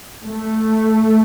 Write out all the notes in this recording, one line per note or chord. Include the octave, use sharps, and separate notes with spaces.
A3